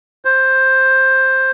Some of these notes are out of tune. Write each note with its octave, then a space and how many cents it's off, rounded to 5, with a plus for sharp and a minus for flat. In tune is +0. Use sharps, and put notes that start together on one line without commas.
C5 +10